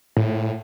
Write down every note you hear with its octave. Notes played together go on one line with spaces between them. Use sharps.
A2